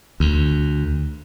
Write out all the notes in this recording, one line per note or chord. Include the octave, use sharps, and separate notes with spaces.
D2